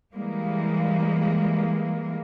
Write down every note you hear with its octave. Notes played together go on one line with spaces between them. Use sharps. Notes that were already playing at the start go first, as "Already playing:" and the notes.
E3 G3 G#3 A#3